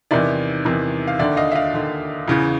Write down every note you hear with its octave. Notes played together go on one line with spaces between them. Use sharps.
E2 C3 D#3 D5 E5
E2 C3 D#3
F5
D#2 D3 D5 E5
D#5 F5
E5
D#5 F5
D#2 D3
E2 C#3 E3